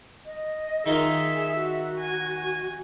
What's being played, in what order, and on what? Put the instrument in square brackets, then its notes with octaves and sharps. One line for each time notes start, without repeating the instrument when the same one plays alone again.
[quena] D#5
[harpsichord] D#3 D#4 F4 [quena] G#4 [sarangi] E5
[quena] F#4
[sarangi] G#5